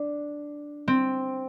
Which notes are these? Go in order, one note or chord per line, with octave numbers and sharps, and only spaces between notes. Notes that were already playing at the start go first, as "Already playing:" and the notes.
Already playing: D4
C4